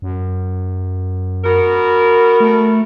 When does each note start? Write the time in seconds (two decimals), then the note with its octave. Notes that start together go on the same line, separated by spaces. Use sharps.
0.02 F#2
1.44 B3 F#4 A#4
2.40 A3